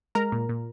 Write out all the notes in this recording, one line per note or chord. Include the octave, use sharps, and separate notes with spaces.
G#3 A#4 A#5
A#2
A#2